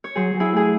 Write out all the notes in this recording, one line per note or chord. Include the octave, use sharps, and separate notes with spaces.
C#5
F#3 G#4 C5
F#3
E4 G#4
A3 G#4